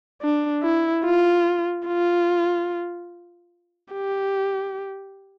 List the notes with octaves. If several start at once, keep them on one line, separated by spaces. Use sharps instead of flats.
D4
E4
F4
F4
G4